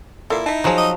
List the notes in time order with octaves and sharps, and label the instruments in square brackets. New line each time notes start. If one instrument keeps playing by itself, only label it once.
[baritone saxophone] A#2 [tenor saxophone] E4 [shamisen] A4 F5
[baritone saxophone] D#4 [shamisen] E5 A5
[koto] F3 F#3 [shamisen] F#4 G#4
[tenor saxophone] D#5